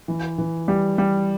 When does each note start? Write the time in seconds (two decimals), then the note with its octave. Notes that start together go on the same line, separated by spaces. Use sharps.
0.08 E3
0.38 E3
0.68 G3
0.98 G3